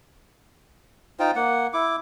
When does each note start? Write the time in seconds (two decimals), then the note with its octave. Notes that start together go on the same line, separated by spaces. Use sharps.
1.19 D#4 F4 C5 G5
1.36 A#3 F#5
1.73 E4 D6